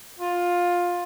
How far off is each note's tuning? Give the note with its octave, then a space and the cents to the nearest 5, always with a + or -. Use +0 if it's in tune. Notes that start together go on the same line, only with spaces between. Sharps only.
F4 +15